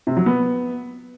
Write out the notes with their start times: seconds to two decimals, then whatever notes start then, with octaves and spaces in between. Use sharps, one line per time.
0.07 C3
0.17 F#3
0.26 B3